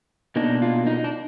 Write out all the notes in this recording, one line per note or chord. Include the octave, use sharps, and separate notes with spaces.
B2 A#3 D4 D#4
F4
D#4
D4